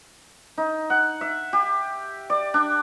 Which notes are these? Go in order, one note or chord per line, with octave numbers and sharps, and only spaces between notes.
D#4
F#5
E5
G4
D5
D4